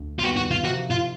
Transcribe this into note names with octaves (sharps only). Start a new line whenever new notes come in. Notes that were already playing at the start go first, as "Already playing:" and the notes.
Already playing: D2
F4
D#2 D#3 G3 B3 F#4
F#4
F4
C3 F3 A#3 D#4 F#4
F4